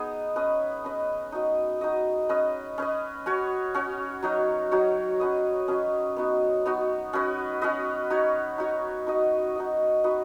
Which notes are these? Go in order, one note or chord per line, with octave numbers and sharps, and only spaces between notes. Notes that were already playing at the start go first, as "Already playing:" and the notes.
Already playing: B3 D#4 G#4 D#5
C#4 B4 D#5
C#4 B4 D#5
D#4 F#4 D#5
D#4 F#4 D#5
C#4 B4 D#5
C#4 B4 D#5
C#4 F#4 C#5
C#4 F#4 C#5
F#3 D#4 F#4 C#5
F#3 D#4 F#4 C#5
F#3 C#4 B4 D#5
F#3 C#4 B4 D#5
B3 D#4 F#4
B3 D#4 F#4
C#4 F#4 B4 D#5
C#4 F#4 B4 D#5
D#4 F#4 C#5
D#4 F#4 C#5
D#4 F#4 D#5
D#4 F#4 D#5
D#4 F#4 B4 D#5